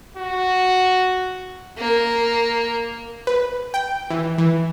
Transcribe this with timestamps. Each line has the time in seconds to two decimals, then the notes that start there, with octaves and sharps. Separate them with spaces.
0.17 F#4
1.78 A#3
3.27 B4
3.74 G5
4.10 E3
4.38 E3